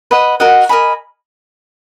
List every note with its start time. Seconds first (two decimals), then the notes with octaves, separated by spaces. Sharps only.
0.11 B4 D#5 F#5
0.40 F#4 A#4 D#5 F#5
0.69 A#4 D#5 G#5 B5